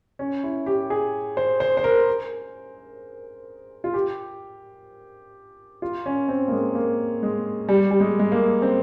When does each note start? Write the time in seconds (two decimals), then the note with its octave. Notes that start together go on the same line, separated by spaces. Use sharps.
0.19 C#4
0.44 E4
0.66 G4
0.90 G#4
1.37 C5
1.60 C5
1.77 C5
1.84 A#4
3.84 F4
3.94 G4
5.82 F4
6.06 C#4
6.29 C4
6.48 A#3
6.52 G#3
6.75 A#3
7.23 G#3
7.69 G3
7.91 G3
8.00 G#3
8.19 G#3
8.32 A#3
8.62 C4